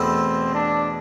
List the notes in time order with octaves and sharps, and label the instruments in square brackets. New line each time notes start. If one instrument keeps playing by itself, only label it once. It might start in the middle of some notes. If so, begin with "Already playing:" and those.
Already playing: [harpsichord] E2 B2 A3 E4 [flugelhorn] C4
[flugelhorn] D4